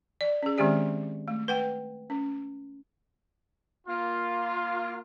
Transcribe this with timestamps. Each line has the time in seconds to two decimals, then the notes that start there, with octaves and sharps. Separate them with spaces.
0.21 D5
0.43 C#4 G#4
0.58 D#3 G#3 C4 C#4 G4 D5
1.28 A3
1.48 B4 F#5 G5
2.10 C#4
3.88 A#3 F4